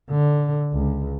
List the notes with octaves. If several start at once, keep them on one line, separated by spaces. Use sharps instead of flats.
D3
C#2